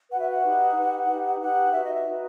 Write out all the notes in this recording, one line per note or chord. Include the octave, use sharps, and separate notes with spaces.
F#4 B4 F#5
E5
F#5
D#4 G4 B4
D#4 G4 B4
D#4 G4 B4
D#4 G4 B4 F#5
D#4 F#4 B4 E5
D#5
E5
D#4 F#4 B4